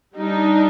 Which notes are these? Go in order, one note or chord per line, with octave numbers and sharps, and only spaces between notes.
G3 D4 D#4